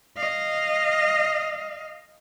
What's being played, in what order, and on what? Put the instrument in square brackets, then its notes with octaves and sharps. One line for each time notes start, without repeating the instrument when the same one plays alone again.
[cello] D#5 F5